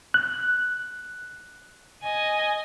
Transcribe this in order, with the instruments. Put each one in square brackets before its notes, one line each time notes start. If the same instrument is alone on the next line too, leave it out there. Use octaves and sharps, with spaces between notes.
[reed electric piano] F#6
[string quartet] D#5 G#5